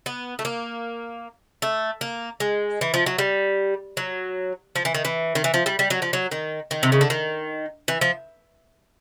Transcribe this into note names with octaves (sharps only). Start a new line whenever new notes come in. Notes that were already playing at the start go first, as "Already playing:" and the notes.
B3
A3
A#3
A3
A#3
G#3
E3
F3
F#3
G3
F#3
F3
E3
D#3
E3
D#3
E3
F3
G3
G3
F#3
F3
F#3
D#3
D#3
C3
C#3
D3
D#3
E3
F3